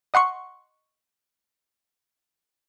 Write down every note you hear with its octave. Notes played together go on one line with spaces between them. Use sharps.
D#5 F#5 C6 C#6